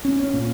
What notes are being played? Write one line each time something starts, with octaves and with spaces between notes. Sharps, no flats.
C#4
C#4
A#2